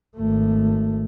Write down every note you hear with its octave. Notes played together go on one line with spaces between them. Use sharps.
G#1 A3